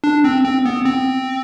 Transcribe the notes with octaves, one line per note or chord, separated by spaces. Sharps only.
D4
C4
C4
B3
C4